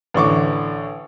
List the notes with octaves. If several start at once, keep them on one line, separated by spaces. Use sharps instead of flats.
A1 D3 C#6 D6